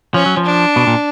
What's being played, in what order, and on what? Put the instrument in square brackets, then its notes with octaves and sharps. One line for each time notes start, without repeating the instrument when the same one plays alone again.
[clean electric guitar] F3 [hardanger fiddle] C#4
[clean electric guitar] F#3
F3
[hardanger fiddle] D4
[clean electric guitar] B2
A#2